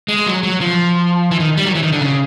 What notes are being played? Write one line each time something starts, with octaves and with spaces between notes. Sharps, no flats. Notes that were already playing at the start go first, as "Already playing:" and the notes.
G#3
F#3
F#3
F3
E3
D#3
G3
F#3
E3
D#3
D3
C#3